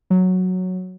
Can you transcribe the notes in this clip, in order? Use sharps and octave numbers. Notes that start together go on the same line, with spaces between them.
F#3